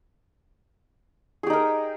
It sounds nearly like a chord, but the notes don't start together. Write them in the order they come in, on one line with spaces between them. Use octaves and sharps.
G#4 G4 D#4 A#4